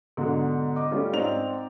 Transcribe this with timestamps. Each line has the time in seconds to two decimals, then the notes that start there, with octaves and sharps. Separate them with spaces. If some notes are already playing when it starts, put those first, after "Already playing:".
0.17 G#2 B2 D3
0.76 D#5 D6
0.91 G3 A3 C#4 F4
1.14 G#2 C4 D#4 D5 F7